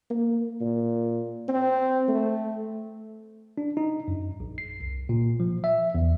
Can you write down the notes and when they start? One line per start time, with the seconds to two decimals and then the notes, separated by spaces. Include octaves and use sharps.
0.10 A#3
0.61 A#2
1.48 C4
2.08 A3
3.58 D4
3.77 D#4
4.08 F#2
4.40 A#1
4.58 C7
4.80 C2
5.09 A#2
5.40 F3
5.64 E5
5.95 E2